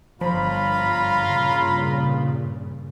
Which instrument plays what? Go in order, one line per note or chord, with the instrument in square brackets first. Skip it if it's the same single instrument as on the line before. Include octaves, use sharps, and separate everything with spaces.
[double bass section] G1 [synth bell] F3 [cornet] F4 [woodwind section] C#5 A#5 B5
[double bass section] G2 A#2 C#3